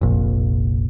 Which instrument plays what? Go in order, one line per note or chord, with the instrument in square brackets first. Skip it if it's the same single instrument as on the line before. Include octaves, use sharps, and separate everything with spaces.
[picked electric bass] F1 A#1